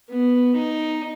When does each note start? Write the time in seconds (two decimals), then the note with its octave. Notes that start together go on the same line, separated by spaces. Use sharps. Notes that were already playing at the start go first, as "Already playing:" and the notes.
0.09 B3
0.56 D#4